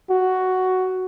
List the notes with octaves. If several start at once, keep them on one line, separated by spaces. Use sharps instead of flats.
F#4